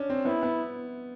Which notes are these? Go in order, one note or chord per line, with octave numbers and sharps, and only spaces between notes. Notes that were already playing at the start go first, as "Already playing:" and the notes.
Already playing: C#4 D4
C4
B3 E4
B3